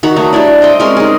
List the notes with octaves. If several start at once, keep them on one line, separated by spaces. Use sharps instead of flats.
D#3 F#4 A#5 B5
F#3 A3 D#4
G3 D4 E4 D5
C5 D#5 G5
G#3 C4 C#4 A#4
D#4 G#4